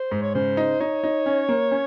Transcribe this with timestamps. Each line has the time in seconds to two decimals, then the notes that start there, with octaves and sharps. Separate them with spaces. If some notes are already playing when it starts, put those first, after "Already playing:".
Already playing: C5
0.11 G#2
0.22 C#5
0.34 C#3 C5
0.57 D#4
0.80 D#4 C#5
1.04 D#4
1.26 C#4
1.49 A#3
1.71 C#4